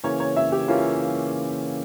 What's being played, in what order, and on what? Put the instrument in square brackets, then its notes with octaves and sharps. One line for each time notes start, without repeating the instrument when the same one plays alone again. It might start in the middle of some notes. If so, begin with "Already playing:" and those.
[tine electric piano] C#3 E3 A#3 C#4 [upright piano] C#5
[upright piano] C#5
E5
G4
[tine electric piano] C#3 E3 A#3 C#4 [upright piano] F4